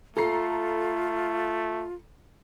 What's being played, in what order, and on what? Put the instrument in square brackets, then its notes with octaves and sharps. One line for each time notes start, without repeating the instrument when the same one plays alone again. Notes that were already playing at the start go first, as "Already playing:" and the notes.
[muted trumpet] A3 [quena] F4 [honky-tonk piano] A4 A#5 C7